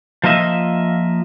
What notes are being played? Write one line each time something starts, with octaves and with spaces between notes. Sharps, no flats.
F3 A#3 F4 D#5 E5